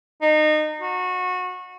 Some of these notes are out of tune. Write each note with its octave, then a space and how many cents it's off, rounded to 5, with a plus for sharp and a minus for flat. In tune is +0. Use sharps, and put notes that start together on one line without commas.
D#4 -25
F#4 -25